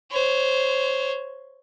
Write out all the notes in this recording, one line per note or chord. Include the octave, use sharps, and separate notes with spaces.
C5 C#5